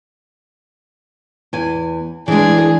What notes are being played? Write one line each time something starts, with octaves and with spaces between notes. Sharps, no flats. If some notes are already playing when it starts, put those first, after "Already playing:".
E2 G#5
E3 G#3 D4 G#4